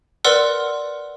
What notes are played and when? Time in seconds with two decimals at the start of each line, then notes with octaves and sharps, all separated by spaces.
0.25 A#4 B4 D5 F#5 C6 E6